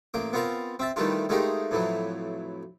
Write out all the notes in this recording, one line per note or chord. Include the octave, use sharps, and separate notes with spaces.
A1 A#3 D6
B3 C4 F4 A#4 F5 A5
C4 E5 A5
D#3 E3 G3 A3 D4 F4
G#3 A3 D#4 F4 G4 A#4
F2 A2 E3 F#3